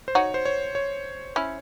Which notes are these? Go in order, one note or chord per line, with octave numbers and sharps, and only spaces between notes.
C5
D#4 F#4 C#5
C5
C#5
C#5
C#4 E4